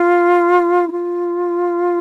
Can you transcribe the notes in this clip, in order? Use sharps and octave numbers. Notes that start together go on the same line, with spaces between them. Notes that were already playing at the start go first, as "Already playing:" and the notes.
Already playing: F4
E4
F4